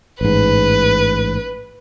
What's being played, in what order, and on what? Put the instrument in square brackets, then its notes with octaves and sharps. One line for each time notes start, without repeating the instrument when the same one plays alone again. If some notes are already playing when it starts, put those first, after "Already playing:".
[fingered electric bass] A1 G#2 [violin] B4